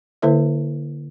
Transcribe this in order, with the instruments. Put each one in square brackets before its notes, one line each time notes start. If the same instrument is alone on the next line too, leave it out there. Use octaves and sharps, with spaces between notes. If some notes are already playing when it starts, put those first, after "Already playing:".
[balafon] D3 A#3 E4 B4 C5 E5